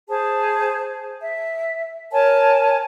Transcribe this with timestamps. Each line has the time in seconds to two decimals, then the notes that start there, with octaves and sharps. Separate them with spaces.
0.09 G#4 C5 A5
1.21 E5
2.11 A#4 C#5 G#5 A5